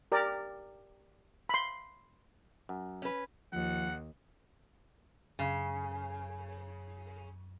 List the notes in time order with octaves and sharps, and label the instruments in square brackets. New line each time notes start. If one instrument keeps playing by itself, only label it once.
[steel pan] G4 A#4 D5
B5 C6
[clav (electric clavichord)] F#2
[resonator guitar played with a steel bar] C#4 B4
[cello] D#2 [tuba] F3 [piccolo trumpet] F#5
[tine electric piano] F#2 [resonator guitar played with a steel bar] C#3